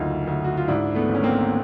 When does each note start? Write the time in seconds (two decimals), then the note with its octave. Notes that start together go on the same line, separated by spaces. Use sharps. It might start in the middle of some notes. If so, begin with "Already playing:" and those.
Already playing: F#1 D2 D#4 F4
0.27 D2
0.44 F#4
0.57 F4
0.68 G#2 D4 E4
0.95 A3 B3
1.09 G#1
1.14 C#4
1.23 A#3 C4